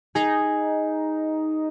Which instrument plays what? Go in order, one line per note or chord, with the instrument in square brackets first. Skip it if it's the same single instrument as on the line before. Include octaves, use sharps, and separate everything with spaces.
[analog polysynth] D#4 [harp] G#4